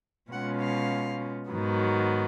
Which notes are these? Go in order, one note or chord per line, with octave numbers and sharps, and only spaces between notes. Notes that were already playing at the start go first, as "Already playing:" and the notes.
B2 G#3 C#4 F4 F#5
F5
G#2 D#3 F#3 B3